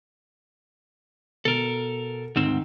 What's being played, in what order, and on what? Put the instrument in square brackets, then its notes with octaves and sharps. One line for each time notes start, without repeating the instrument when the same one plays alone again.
[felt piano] B2 [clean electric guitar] A4 A#4
[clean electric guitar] D2 G#2 C4 [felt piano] D#3